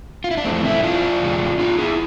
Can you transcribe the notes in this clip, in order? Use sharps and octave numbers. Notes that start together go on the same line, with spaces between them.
F4
E4
D4
F2 E3 A3 C4
C4 E4
D4 F4
E2 C3 G#3
D4 F4
E4 G#4